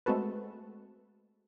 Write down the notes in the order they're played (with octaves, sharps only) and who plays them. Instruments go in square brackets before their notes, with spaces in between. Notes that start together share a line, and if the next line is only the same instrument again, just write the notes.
[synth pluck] G#3 A3 C4 F#4 A4 B4